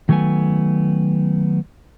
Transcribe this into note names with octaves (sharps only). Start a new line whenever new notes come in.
D#3 F#3 A3 B3 G#5